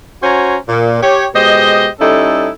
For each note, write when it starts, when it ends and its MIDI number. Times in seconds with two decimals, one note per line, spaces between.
0.23 0.57 61
0.23 0.57 66
0.23 0.57 72
0.23 0.57 73
0.23 0.57 80
0.23 0.57 82
0.69 1.01 46
1.02 1.26 67
1.02 1.26 73
1.35 1.88 47
1.35 1.88 56
1.35 1.88 67
1.35 1.88 72
1.35 1.88 75
2.01 2.49 55
2.01 2.49 61
2.01 2.49 63
2.01 2.49 64
2.01 2.49 69